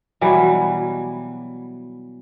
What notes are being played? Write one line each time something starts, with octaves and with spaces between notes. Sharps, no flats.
B2 E3 F#3 G3